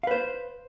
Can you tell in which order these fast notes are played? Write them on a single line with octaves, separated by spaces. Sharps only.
F5 B4 C5